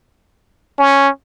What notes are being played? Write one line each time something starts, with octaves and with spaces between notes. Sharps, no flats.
C#4